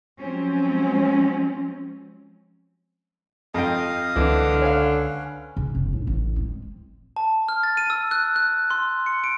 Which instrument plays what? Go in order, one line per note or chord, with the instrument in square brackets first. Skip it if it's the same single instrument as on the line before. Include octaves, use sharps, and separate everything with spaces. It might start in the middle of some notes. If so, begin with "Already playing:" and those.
[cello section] F3 F#3 G#3 C4 C#4
[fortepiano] F2 G5 [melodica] D#5 F5 D#6
[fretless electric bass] C#2 C4 [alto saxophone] D3 [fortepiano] E3
[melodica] C#4 B4 [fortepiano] C#5 F5
[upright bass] C#3
E1 F#2
A2 D4
A1
G#3 C4
[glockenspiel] A5
F6
A6
D#7
E6
F#6
F#6
C6
C#7
D7